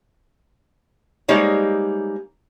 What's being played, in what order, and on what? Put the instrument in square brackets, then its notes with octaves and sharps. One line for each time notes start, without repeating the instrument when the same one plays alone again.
[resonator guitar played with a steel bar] G3 G#3 A#3 D#4 C5 C#5